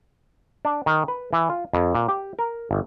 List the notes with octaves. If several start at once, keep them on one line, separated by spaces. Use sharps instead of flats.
D4
D#3
B4
E3
F4
F2
A#2
G4
A#4
G1